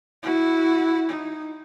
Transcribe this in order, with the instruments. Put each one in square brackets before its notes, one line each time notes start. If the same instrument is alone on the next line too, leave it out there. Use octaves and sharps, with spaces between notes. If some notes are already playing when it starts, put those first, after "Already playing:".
[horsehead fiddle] E4 F#4
D#4